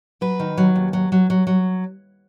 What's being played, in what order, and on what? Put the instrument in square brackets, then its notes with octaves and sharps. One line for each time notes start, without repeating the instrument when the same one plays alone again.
[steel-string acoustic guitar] F#3 B4
D#3
F#3
D#2
F#3
F#3
F#3
F#3